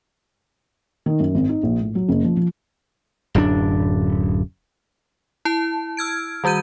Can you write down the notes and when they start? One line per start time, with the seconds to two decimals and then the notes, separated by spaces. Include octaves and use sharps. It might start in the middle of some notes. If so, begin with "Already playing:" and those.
1.06 D#3
1.20 F#2
1.35 G#1
1.49 D#4
1.63 A#1
1.81 A2
1.95 F#3
2.08 F#1
2.24 F3
2.37 F3
3.35 D1 F#2 F#3 D4
5.45 E4 A5
5.97 E6 F6 G#6 D7
6.44 D#3 G3 F#4 G6 D#7